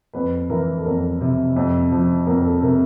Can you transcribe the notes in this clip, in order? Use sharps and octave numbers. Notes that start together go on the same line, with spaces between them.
F2 B4
E3 A#4
A4
F2 A#4
C3
F2
F3
F2 A#4
A4
C3 A#4